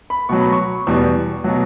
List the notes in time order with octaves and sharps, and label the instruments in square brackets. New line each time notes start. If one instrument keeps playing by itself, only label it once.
[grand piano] B5
B2 F#3 C#6
B5
C#6
E2 B2 G3
B2 F#3